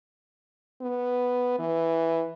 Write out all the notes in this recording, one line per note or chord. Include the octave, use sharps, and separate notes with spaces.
B3
E3